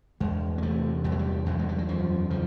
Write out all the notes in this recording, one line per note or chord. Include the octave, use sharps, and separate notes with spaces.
E2 G#3
A#3
C3 A3
E2 G3
F#3
G3
E2 F#3
G#3
G3
F#3
F#2 F3
C#3 F3